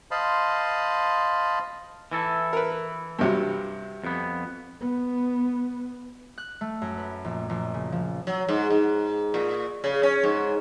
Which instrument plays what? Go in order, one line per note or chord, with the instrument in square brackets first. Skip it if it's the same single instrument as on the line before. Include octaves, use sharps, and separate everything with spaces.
[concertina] C5 D#5 F5 A5 B5 C6
[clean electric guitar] E3 E4 A4
[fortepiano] A#4 B4
G2 C3 F#3
[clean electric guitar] F2 B3
[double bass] B3
[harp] F#6
A3
F#2
B4
A#1
A#1
C#3
F3
[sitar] F#3
G#2
G#2
A#2
C#3
C#4
G#2